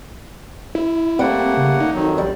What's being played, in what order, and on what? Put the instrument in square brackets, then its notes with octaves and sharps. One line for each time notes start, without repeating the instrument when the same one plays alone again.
[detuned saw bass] E4
[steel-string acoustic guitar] G3 [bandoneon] A3 A#3 F#5 [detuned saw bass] C4
[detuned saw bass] C#3
D#4
[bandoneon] F2 D#3 F#3
[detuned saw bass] A#1 [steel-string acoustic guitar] G3